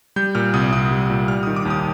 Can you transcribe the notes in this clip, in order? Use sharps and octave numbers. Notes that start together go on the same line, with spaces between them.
G3 G6
A#2 F6
C2 D#6
C2 D#6
G3
A#2
G3 F6
D#3 D#6
D6
D#2
D#6